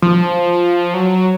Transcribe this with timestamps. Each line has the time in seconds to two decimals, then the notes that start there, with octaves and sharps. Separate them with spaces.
0.02 F3
0.94 F#3